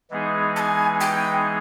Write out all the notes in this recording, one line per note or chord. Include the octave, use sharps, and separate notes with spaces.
E3 G#3 B3 D#4 G#4
A5
G#5
G5